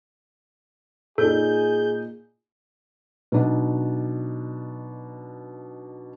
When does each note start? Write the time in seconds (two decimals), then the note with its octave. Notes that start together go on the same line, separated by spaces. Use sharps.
1.18 A#2 D#4 G#4 A4 G6
3.32 B2 F#3 D4 D#4